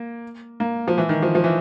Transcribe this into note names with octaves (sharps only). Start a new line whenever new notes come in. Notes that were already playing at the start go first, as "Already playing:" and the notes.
Already playing: A#3
A#3
F3
E3
D#3
F3
F3
E3